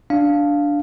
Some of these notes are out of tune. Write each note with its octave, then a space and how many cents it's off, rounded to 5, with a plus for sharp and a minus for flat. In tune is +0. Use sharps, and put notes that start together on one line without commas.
D4 -5 F5 +0